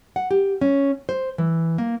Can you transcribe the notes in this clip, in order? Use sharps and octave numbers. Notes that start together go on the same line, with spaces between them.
F#5
G4
C#4
C5
E3
A#3